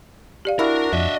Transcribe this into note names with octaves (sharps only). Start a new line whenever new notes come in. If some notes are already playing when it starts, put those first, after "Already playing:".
G4 D5 F5
D4 E4 F#4 A#4 B5 F6
F2 D#5 E5